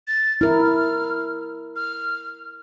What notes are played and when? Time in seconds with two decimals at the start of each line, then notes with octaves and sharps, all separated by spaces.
0.08 A6
0.41 E4 A#4 F6
1.76 F6